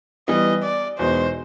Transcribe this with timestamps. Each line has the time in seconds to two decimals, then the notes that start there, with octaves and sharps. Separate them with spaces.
0.28 E3 G3 B3 D#5
0.63 D5
0.99 E2 B2 G#3 B3 D#4 C5